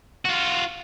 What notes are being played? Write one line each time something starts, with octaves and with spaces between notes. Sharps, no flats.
F4 F#4